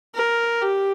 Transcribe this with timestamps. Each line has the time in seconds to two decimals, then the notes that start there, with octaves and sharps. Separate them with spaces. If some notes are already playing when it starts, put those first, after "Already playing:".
0.15 A#4
0.62 G4